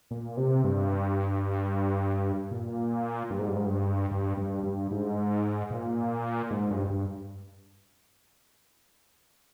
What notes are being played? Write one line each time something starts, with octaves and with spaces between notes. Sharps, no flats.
A#2
C3
G2
A#2
G2
G#2
G2
G#2
G2
G2
G2
G2
G#2
A#2
G#2
G2
G2